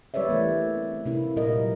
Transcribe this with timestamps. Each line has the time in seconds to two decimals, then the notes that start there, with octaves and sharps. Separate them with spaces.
0.14 G3 G4 B4 C#5 D5 E5
0.29 E3 A3 A#3
0.77 C4
1.06 C3 A#3 E4
1.36 A#2 G3 F4 A#4 D#5
1.59 F#3